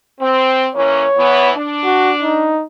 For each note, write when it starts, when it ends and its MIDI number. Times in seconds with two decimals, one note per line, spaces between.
0.20 0.68 60
0.75 1.05 52
0.75 1.05 58
0.75 1.05 61
0.75 1.50 73
1.17 1.50 52
1.17 1.50 59
1.56 2.56 62
1.84 2.11 66
2.23 2.64 63